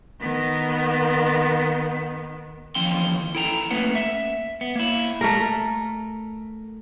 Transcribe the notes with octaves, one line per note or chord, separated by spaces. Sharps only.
D#3 B3
D#2 E3 F3 C#4 G5 C6
E4 A4 G5 A#5
A3 A#3 C#4 B4 F#5
E5
B3
A#3 E4
A3 A#4